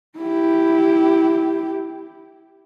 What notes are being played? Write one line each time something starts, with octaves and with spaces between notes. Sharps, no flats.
E4 G4